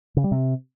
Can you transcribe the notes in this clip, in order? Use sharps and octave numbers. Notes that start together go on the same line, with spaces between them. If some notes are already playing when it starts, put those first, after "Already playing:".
C#3
G3
C3